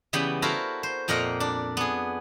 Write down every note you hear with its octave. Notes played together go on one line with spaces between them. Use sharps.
C#3 E3 G3 B3 G5 B5
E4 F#4 A4 A#4 C5 F5
C5
F2 A#2 A#3 A#4 D#5 F#5
D4
B3 G#4